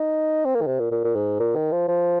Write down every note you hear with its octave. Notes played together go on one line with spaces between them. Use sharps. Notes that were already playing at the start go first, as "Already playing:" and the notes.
Already playing: D#4
C4
A#3
D#3
C3
A#2
A#2
A#2
G#2
A#2
D#3
F3
F3